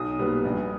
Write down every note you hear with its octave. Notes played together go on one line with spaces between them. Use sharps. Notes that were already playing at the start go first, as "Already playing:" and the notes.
Already playing: B1 D#6
A#2 G3 B3
A#1